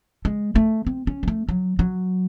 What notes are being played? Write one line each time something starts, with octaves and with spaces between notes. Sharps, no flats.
G#3
A3
C4
C#4
G#3
A3
F#3
F#3